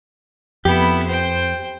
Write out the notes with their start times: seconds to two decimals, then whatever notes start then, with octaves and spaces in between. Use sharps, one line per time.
0.65 F2 B3 E4 G4
1.07 C5 G5